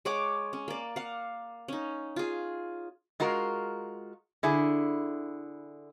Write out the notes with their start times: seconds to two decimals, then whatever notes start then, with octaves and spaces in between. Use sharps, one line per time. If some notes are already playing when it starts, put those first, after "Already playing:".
0.05 G#3 C#5 F#5 D6
0.53 C#4
0.68 A#3 D5
0.96 F5 F#5
1.68 C#4 D#4
2.16 F4 G#4
3.20 G#3 F4 F#4 A#4
4.43 D3 E4 G#4